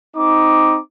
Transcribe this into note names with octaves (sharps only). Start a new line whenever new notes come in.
C4 D#4 D6